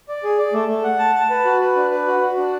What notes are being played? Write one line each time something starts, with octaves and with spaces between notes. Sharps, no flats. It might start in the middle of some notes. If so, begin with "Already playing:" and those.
D5
G#4
D5
A3
A3
F#5
A5
A5
B4
F#4
B4
D4
B4
F#4
F#4
D4